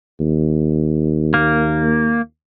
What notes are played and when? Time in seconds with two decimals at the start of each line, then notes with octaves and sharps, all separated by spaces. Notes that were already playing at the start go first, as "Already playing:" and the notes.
0.20 D#2
1.34 A#3